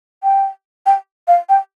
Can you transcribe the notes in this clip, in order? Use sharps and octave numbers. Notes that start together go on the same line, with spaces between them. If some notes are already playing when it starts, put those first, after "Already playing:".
G5
G5
F5
G5